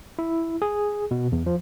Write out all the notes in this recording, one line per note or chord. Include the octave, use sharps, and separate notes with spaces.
E4
G#4
B2
E2
F3